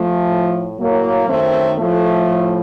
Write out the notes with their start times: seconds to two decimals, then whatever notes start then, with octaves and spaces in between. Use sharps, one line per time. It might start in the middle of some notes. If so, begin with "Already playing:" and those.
Already playing: F3 A3
0.28 A2
0.78 A2 F#3 A#3
1.27 F#2 D#3 A3 C4
1.78 A2 F3 A3
2.27 A2